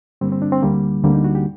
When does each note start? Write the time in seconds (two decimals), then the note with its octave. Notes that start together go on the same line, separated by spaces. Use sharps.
0.21 G2 D3 G3 A#3 C4
0.32 C4
0.42 D4
0.52 C4
0.62 D2 D3 G3 A#3
1.04 D2 D3 G3 A#3 C4
1.14 D#4
1.24 F#4
1.35 G4